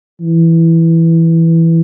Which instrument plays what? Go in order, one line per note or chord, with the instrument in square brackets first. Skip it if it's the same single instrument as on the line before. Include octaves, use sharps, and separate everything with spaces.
[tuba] E3